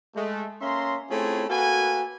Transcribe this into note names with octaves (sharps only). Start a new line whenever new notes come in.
G#3 A3
A#3 C#4 E5 A#5 C6
A3 C4 C#4 E4 F4 G#4
A#3 F#4 A4 B4 G#5